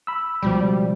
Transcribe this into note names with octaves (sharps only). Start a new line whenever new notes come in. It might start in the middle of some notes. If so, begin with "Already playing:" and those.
B5 E6
C#2 B2 F3 G3